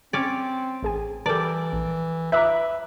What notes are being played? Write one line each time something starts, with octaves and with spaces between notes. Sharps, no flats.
C4 C#4 D5
A1 G#4 G#5
E3 G3 A4 A#4 D5 A5
A#1
B4 E5 A#5 D6 F#6